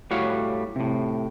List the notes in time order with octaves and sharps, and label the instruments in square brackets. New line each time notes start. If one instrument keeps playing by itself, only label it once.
[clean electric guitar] A2 G3 F#4 C#5 F5
A2 C3